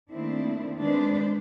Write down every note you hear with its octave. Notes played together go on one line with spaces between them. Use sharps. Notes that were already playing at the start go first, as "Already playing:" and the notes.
D#3 A3 A#3 C4 D4 E4
D#3 G#3 C4 D4 B4 C5